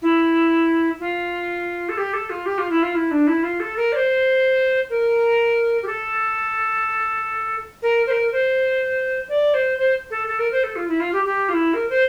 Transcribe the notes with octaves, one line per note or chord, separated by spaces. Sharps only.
E4
F4
A4
G4
A4
F4
G4
F4
E4
F4
E4
D4
E4
F4
A4
A#4
D5
C5
A#4
G4
A4
A#4
C5
A#4
C5
D5
C5
C5
A4
A4
A#4
C5
A4
F4
E4
F4
G4
G4
F4
E4
A#4
C5